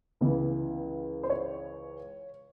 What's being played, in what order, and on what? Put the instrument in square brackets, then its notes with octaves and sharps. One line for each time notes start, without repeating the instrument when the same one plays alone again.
[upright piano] C#2 C#3 E3
C5
C#5